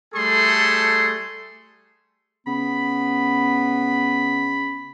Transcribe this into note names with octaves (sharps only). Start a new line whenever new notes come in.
G3 A3 G#4 A4 C6
C#3 B3 B5